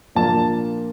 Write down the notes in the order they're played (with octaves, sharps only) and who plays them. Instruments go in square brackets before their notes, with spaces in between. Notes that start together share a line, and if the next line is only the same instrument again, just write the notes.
[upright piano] A#2 F3 A#3 D4 A5